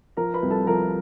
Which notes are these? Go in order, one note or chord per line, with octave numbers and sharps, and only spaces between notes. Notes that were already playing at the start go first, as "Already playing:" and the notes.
F3 A#4 A#5
B4 B5
C2
A4 A5
F3 A#4 A#5